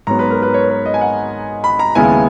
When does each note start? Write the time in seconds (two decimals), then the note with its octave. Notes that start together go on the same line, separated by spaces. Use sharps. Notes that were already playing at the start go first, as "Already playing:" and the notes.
0.07 G#2 F#3 B3 A#5
0.19 B4
0.30 A#4
0.42 B4
0.54 C#5
0.70 B4
0.86 D#5
0.94 G#5
1.01 F#5
1.64 B5
1.79 A#5
1.95 D#2 C#3 G#3 B3 E4 G#5